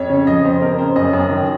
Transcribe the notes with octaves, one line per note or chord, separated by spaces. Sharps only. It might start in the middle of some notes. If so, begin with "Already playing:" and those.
Already playing: F2 C#5
C#3
F3 D#5
F2 C5
F2 A#4
C#3 C5
F#2 D#5
F#2
D#3